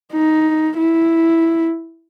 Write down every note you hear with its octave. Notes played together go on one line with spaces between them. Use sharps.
D#4
E4